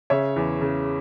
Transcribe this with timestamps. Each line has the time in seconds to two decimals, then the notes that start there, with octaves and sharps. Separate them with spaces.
0.10 C#3 C#5 E5
0.36 E2
0.61 C#3